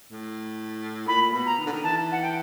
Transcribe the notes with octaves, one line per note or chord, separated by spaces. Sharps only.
A2
A#2 B5
B2
A#5
D#3
D3
D#3
E3 A5
F#5
G5